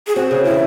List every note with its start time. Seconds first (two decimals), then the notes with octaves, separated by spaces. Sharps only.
0.07 G#4
0.16 C4 F#4
0.30 C#3 G#4
0.45 E3 E4